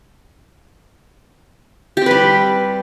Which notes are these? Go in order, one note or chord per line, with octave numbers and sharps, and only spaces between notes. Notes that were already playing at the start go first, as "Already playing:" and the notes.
G3 C4 G4 B4